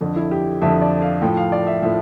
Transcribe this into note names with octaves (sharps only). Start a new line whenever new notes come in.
F2 D3 F3
E4
G4
F2 D3 F3 E5
D5
F5
A2 F3 G5
F5
D5
E5
A2 F3 E5